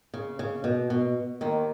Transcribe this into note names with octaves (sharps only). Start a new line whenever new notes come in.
C#3
C#3
B2
B2
D#2 D#3